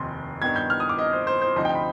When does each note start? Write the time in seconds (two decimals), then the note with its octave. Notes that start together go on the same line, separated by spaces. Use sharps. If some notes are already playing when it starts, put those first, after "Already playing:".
Already playing: F1 D#2 D#3 C6
0.42 G2 D#3 B3 G#6
0.56 G6
0.70 F6
0.80 D#6
0.89 D6
0.99 D#5
1.13 C5
1.27 C5
1.42 C5
1.56 D2 C3 F3 C4 D#4 D#5
1.65 G5
1.75 B5